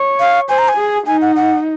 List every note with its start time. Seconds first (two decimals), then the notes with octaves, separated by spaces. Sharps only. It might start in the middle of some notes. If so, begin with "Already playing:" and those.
Already playing: C#5
0.20 F5
0.49 C5 G#5
0.58 A#5
0.68 G#5
0.77 G#4
1.07 D#4 G#5
1.22 F#5
1.36 F#5